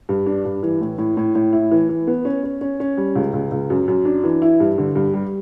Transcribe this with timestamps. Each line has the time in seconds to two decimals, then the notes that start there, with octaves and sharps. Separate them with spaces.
0.09 G2
0.26 D4
0.45 G2
0.63 E3
0.81 A2
0.98 A2
1.17 A2
1.35 A2
1.53 E4
1.71 E3
1.89 E3
2.07 B3
2.25 C#4
2.44 C#4
2.61 C#4
2.80 C#4
2.97 G3
3.15 C#2
3.33 C#2
3.51 C#2
3.70 F#2
3.88 F#2
4.05 D4
4.24 E3
4.42 E4
4.60 G2
4.78 D3
4.96 G2
5.14 G3